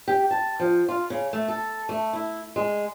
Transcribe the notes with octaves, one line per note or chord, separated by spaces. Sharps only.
G4
A5
F3
F4
C#3
A3
A4
A3
E4
G#3